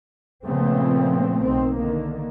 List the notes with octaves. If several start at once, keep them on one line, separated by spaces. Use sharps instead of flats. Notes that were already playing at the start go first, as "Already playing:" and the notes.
A#2 C#3 F3 A3 B3 C4
B1 D#3 C4
D3 D#3 A#3